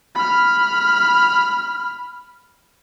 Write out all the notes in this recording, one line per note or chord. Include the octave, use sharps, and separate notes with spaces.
B5 F6